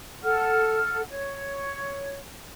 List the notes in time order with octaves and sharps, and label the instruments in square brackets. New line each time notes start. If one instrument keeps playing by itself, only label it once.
[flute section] A4 F#5 F6
C#5